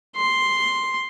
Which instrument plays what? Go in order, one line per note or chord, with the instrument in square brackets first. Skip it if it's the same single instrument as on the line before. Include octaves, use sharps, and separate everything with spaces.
[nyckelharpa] C6